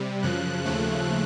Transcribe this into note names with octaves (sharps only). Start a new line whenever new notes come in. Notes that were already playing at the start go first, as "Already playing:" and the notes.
Already playing: C3 G3
F#2 C#3 F3 F#6
D#2 C#3 F3 A3